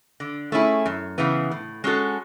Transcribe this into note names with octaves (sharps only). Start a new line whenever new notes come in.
D3
A3 C#4 E4 G#4
F#2
C#3 E3 B3
A2
G#3 C#4 F#4 A4